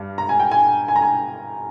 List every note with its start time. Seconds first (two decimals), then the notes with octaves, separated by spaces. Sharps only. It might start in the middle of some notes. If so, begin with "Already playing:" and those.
Already playing: G2 G3
0.18 A#5
0.29 G#5
0.40 G5
0.52 G#5
0.88 G#5
0.96 A#5
1.02 G#5